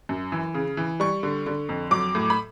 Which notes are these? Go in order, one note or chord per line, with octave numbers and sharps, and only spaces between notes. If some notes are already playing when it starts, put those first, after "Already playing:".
F#2
E3
C#3
E3
G3 C#6
D3
D3
F2
F#3 D6
A2
B5